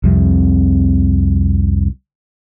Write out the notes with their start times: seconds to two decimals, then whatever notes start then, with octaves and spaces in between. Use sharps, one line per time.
0.04 C2 F2 C3